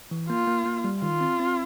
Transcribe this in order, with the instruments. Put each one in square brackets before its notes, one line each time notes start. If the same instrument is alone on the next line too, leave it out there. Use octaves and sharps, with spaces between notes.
[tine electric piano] E3
[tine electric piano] A#3 [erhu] F4
[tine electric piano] A#3
A#3
G3
[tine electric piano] D#3 [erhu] F4
[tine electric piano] C4
C4